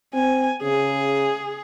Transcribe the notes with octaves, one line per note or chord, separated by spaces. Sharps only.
C4 G#5
C#3 G#4